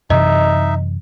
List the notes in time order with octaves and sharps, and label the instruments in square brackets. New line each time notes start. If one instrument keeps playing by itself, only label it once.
[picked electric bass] F#2 C3 E3 [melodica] D#4 E5 [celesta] D#5